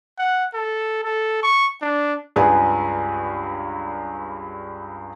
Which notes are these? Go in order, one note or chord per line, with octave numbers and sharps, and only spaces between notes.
F#5
A4
A4
C#6
D4
C#2 G2 G#4 B4 D5 G#5